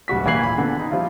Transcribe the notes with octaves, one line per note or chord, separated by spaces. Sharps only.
D1 G3 F#4 B6
E1 E3 A#3 G#6 C7 F#7
A#2 B5
D3 B3
D#4
F3 G3 E4 F4